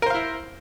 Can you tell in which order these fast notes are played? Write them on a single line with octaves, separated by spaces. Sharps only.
A#4 C5 F5 E4